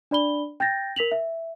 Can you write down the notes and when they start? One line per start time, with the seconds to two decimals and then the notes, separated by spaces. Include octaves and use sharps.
0.11 D4 D5 B5 G7
0.60 G5 G6 A6 A#6
0.96 A#4 B6 F7 F#7
1.11 E5